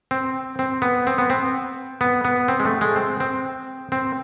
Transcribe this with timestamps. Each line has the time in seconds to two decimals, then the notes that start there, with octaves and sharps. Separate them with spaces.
0.11 C4
0.59 C4
0.82 B3
1.07 C4
1.18 B3
1.30 C4
2.01 B3
2.25 B3
2.48 C4
2.60 G#3
2.65 A3
2.81 G#3
2.96 C4
3.20 C4
3.92 C4